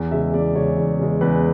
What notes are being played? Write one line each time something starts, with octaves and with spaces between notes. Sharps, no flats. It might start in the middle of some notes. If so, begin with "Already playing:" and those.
Already playing: E2
C#3 G#3 E5
E2 D5
C#3 G#3 C#5
E2
C#3 G#3
E2 B4